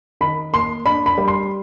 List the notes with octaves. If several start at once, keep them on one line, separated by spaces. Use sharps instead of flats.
D#3 B5
A#3 C6
D4 B5
B5
G3
C6